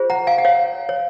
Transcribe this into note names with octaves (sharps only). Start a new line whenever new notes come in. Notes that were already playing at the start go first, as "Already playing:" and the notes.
Already playing: F4 G#4 C5
F#5 A#5
F5 G#5
F#5
C#5 F5
C#5